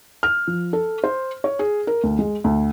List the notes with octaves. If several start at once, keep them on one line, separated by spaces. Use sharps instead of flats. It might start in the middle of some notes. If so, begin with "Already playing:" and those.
F6
F3
A4
C5
C#5
G#4
A#4
D2
G#3
D2